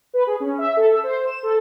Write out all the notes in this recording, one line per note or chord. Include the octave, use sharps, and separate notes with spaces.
B4
G#4
C#4
E5
A4
E5
C5
E7
A4